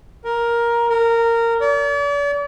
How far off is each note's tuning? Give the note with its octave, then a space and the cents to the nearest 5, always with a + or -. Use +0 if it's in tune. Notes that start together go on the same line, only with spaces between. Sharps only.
A#4 +10
A#4 -15
D5 -40